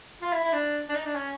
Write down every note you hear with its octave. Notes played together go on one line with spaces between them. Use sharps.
F4
E4
E4
D4
D4
D#4
D4
C#4